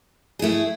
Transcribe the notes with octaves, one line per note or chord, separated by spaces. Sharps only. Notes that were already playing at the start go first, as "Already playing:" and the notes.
A3 E4 G#4